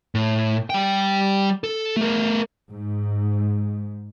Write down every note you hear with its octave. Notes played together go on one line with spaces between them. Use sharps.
A2
G3 G5
A4
A3 A#4
G#2